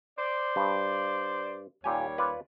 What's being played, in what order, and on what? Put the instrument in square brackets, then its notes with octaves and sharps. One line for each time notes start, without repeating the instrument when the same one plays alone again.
[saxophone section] C5 D5
[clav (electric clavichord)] G2
[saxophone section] D#2 G3 C#5 [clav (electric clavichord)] A#2 G4 G#5
[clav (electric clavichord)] F4 B4 D5